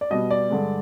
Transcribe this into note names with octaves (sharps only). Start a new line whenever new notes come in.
D5
B2 G3 B3 D#5
D5
G2 D3 G#3